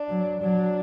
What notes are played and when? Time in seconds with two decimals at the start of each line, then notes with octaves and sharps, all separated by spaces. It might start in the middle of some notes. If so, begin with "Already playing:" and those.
Already playing: D4
0.09 F#3
0.41 F#3 D4